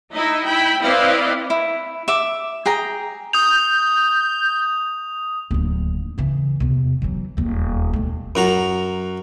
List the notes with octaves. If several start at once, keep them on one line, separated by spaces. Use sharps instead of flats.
D#4 E4 D#5
E4 G5 B5
C4 E4 B4 D5 D#5 F5
E4
E5 D6
G#4 G5 A#5
D#6 G6 F7
D1 D#2
C#3 E3
E2 C3
E3 F#3
D#1 E2
B1 A3
F#2 F#4 A#5